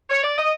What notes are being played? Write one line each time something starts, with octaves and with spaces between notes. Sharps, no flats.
C#5
D5
D#5